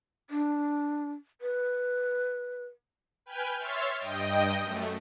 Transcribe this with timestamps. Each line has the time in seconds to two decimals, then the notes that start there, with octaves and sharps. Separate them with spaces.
0.30 D4
1.41 B4
3.26 B4 G5 G#5 F6 G6
3.59 C#5 E5 C6 F6 A6
3.97 G2 D#5 G5
4.61 F#2 A3